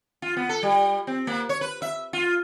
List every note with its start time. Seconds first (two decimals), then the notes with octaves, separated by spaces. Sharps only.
0.22 F4
0.37 B3
0.49 A4
0.63 G3
1.07 C4
1.27 A#3
1.49 C#5
1.61 B4
1.82 E5
2.13 F4